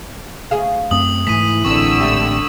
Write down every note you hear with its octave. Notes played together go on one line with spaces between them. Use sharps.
D2 G#4 F5
F#2 A3 C4 D#6 F#7
G#2 E3 A3 B6 D#7
A1 G#2 D3 C4 C#6 E6
A3 G4